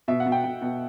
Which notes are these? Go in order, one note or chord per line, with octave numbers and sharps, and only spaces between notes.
B2 E5
F#5
B2
G5
B2 G5
B2